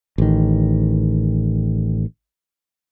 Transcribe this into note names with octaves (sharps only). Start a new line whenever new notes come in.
A1 D#3